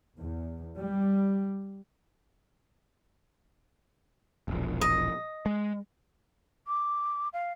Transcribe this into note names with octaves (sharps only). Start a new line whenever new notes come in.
E2
G3
E1 A#1
D#5
G#3
D6
F5